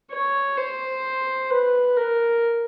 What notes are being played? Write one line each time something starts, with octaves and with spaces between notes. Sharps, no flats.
C#5
C5
B4
A#4